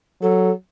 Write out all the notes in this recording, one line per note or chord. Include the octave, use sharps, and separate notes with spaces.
F#3 A4